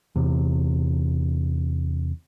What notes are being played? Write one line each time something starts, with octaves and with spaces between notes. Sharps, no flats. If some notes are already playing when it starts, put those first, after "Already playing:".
E2 C3